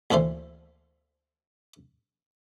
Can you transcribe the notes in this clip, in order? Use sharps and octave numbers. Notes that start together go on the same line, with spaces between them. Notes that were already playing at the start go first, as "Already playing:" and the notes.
D2 A#2 E3 A4 C5